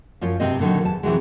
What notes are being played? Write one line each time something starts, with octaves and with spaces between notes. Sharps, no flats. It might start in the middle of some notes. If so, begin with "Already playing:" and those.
F#2 F3 F4 C#5
G2 C3 D#3 A3 C4 D#5
A#2 D3 D#3 F3 F#3
E2 A5
C3 E3 F#3 G#3